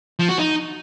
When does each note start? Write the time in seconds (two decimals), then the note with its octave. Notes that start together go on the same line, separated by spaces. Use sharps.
0.19 F3
0.29 F#4
0.39 D#4